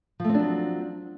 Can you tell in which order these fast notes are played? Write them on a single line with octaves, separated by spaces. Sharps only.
F3 A3 C4 D4 F#3